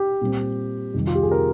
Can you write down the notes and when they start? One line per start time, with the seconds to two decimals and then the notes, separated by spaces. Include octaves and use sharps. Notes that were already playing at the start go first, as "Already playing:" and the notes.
Already playing: G4
0.21 A#2 G3 C4
0.94 F2 C3 D#3 G3
1.07 F4
1.15 G4
1.23 G#4
1.31 A#4